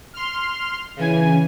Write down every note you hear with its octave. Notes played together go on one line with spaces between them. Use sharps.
C6 F6
C#3 E3 G#5